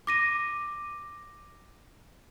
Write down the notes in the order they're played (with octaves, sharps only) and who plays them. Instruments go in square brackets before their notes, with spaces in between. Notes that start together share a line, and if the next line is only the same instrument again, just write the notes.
[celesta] D6 A#6 D#7